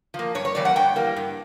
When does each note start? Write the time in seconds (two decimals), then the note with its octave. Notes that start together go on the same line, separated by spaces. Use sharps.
0.14 F3
0.19 A#3
0.35 G2 C#5
0.45 C#5
0.55 E3 G3 A#3 D5
0.65 F#5
0.76 G2 G5
0.96 E3 G3 A#3
1.16 G2